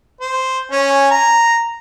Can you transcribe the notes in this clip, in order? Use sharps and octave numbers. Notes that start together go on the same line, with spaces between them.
C5
C#4 G#5
A#5